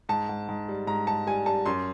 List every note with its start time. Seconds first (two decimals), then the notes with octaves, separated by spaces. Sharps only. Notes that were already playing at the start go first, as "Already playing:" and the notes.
0.09 G#2 A5
0.29 G#2
0.49 G#2
0.68 G3
0.87 G#2 A#5
1.07 G#2 A5
1.27 G3 G#5
1.46 G3 A5
1.66 F#2 C6